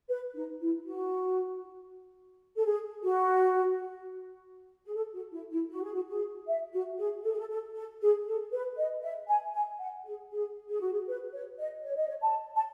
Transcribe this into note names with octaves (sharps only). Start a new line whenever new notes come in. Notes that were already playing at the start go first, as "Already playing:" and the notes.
B4
D#4
E4
F#4
A4
G#4
F#4
G#4
A4
F#4
E4
E4
F#4
G#4
F#4
G#4
E5
F#4
G#4
A4
G#4
A4
A4
A4
G#4
A4
B4
D#5
E5
G#5
G#5
F#5
G#4
G#4
G#4
F#4
G#4
B4
C#5
D#5
C#5
D#5
C#5
A5
A5